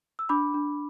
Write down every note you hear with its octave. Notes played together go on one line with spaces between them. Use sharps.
E6
D4 B5 D6
D4